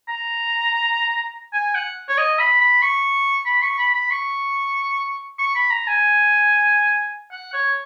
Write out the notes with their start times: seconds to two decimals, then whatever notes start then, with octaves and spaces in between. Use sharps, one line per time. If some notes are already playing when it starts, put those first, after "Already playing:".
0.09 A#5
1.53 G#5
1.75 F#5
2.09 C#5
2.18 D#5
2.39 B5
2.61 B5
2.82 C#6
3.46 B5
3.62 C#6
3.79 B5
3.94 B5
4.11 C#6
5.39 C#6
5.55 B5
5.70 A#5
5.87 G#5
7.31 F#5
7.54 C#5